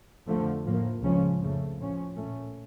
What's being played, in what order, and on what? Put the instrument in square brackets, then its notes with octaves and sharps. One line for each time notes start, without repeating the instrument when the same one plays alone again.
[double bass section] F2 D3 F3 A3
A2 F3 A#3
C#2 C#3 F3 C#4
F2 C#3 F3 A3
A2 F3 C#4
A#2 A3 C#4